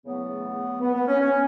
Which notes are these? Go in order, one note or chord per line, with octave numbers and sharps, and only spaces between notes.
E2 C#3 F#3 A3 B3
B3
B3
C#4
C#4